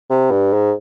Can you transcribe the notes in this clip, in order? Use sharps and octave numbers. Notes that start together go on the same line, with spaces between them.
C3
G2
G#2